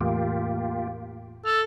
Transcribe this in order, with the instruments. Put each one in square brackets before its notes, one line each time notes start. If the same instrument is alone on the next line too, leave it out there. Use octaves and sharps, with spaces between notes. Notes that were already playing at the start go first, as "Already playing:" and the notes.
[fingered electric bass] E2 A2 [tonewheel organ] A#3 F4 G4
[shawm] A4 [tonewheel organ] F6